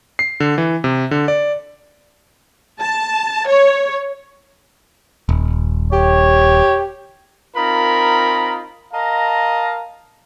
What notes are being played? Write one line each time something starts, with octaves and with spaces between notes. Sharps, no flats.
C7
D3
E3
C3
D3
D5
A5
C#5
D#1
G4 C#5
C4 D#4 F4 A#4 A#5 B5
A#4 D#5 F5 A5 A#5